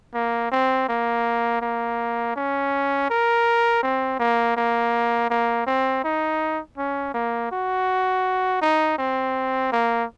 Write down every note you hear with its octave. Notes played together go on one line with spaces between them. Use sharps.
A#3
C4
A#3
A#3
C#4
A#4
C4
A#3
A#3
A#3
C4
D#4
C#4
A#3
F#4
D#4
C4
A#3